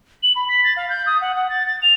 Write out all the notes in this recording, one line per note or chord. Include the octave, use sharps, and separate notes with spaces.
F#7
B5
B6
A6
F5
G6
D#6
F#5
F#5
A6
A6
F7